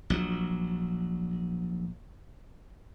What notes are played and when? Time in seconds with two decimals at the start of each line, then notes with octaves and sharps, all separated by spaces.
0.10 A#1 F#3